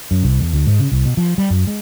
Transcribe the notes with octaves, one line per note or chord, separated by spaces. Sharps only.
F#2
C2
E2
D2
G#2
C#3
C2
B2
F3
G3
F#2
G#3